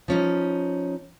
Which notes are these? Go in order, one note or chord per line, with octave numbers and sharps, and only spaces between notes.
F3 C#4 D#4